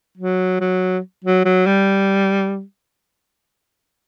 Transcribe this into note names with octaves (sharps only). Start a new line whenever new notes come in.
F#3
F#3
F#3
F#3
G3